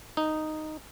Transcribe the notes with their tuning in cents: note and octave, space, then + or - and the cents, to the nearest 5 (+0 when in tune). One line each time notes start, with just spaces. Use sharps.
D#4 -5